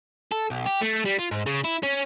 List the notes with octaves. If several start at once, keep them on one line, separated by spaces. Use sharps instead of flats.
A4
B1
G4
A3
G3
F4
G#2
C#3
E4
C#4